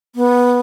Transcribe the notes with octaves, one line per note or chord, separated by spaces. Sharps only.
B3